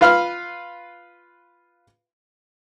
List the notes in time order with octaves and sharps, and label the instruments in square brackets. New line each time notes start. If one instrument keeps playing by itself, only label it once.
[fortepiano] F4 B4 F5 B5 F6